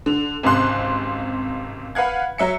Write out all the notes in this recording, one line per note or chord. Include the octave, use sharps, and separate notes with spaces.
D3
G#1 C#2 C3 C6 F#6
B4 F5 F#5 G#6
F#3 E5 C#7